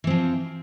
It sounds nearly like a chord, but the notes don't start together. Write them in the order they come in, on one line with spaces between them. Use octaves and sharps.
E3 C4 F3